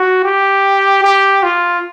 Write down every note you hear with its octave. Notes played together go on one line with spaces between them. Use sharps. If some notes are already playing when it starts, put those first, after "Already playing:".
Already playing: F#4
G4
G4
F4